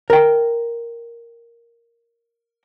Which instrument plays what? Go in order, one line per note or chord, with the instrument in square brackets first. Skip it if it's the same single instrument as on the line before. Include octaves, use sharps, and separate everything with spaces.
[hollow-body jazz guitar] A#4 G5